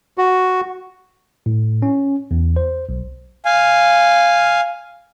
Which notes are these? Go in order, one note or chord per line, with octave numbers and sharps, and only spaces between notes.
F#4
A2
C#4
E2
C5
B1
F5 G#5